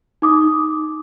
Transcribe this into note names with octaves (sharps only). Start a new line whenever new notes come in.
D#4 D6 D#6